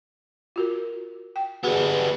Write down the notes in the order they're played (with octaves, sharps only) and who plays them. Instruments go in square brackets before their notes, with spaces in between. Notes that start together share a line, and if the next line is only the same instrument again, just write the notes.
[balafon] F4 F#4 A#4
G5
[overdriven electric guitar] G3 B3 [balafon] F#4 G#4 B4